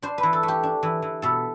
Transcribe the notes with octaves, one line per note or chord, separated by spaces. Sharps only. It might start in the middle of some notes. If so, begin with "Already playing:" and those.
D4 C5
B4
E3
A4
A3
G4
D4
E3
E3
B2 A4